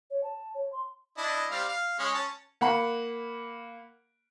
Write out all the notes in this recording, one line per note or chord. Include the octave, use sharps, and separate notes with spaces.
C#5
A5
C#5
C6
D4 E4 D#5
G3 C4 F5
F5
G#3 C#4 G#4
C#4 A5
A#3 F#5 B5